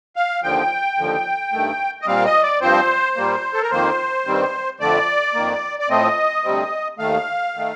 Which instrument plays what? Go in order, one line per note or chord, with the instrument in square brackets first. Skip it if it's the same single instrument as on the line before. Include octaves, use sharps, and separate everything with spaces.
[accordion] F5
D#2 D3 F3 G5
D#2 D3 F3
G2 D#3 A3
D#5
A#2 G3 C4 F5
D#5
D5
G2 F3 C4 C5
A#2 G3 A#3
A4
A#4
F2 D#3 A#3 C5
G2 D#3 G3 C4
F2 D3 A3 D5
F2 D#3 A#3
D5
A2 F3 A3 C4 D#5
D2 C3 G3 C4
D#2 D#3 A3 F5
D#3 A3